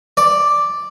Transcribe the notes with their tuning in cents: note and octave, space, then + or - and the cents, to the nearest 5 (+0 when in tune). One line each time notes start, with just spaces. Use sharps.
D5 +0